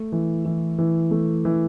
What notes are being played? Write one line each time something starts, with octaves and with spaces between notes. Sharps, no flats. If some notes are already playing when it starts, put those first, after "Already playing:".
Already playing: A3
E3
E3
E3
A3
E3